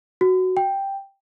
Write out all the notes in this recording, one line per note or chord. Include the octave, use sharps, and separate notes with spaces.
F#4
G5